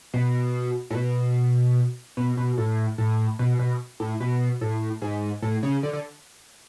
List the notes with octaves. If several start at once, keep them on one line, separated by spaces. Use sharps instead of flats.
B2
A2
B2
B2
B2
A2
A2
B2
B2
A2
B2
A2
G#2
A2
C#3
D3
D3